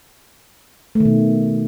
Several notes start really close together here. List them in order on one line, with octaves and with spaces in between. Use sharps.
A3 D#3 B2